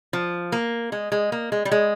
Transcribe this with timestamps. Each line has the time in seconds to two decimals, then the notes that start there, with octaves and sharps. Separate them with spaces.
0.13 F3
0.52 A#3
0.92 G#3
1.12 G#3
1.32 A#3
1.52 G#3
1.65 G3
1.72 G#3